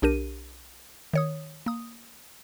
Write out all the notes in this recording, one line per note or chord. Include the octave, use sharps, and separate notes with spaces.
B1 D4 G4 A#4 D#7
D#3 C#5 D#6
A#3 D#6